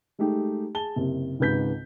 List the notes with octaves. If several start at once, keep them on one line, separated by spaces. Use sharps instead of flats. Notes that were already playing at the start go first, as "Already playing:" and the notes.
G#3 A3 D#4 G4
G#4 A5 G7
F#1 C3
G#1 C#2 G#2 B4 G6 B6